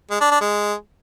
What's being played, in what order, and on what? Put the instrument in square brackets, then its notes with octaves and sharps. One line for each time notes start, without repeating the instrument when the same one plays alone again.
[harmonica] G#3
D4
D4
G#3